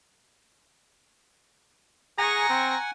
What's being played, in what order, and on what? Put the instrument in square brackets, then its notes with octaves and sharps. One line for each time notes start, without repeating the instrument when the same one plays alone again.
[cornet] G#4 [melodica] F#5 G#5 [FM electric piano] A#5 [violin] C#6 A#6
[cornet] C4